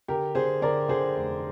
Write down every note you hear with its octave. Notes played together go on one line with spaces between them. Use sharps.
D3 G4 A#4
D3 G#4 C5
D3 A#4 D5
D3 G#4 C5
F1